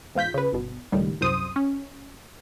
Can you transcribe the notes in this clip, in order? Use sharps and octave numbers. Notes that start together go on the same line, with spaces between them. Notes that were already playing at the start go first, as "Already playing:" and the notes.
E2 G#2 F4 G6 B6
C#3 B4
G1 B2
C#2 A2 D#3 G3
C2 F#2 C5 D#6
C#4